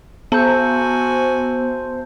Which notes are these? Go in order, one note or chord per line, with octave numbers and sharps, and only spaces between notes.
B3 F#4 C5 G#5 A5 G6